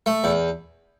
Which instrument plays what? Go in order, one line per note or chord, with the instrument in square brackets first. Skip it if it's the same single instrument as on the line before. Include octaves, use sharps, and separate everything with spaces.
[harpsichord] A3
E2